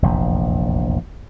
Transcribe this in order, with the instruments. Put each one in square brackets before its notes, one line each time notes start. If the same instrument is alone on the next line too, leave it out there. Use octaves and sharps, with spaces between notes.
[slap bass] F1 A#1 E2